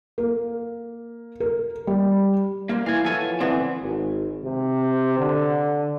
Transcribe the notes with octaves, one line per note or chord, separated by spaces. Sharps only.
A#3
A#4
G3
A#3 A#4 C5
E3 F5 G#5
F3 B3 A4 C#5 G#5
D3 E3 B3 C4
G#1
C3
D3